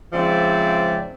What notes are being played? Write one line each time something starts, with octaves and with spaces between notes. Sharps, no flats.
G#2 C#3 F3 C4 D5 E5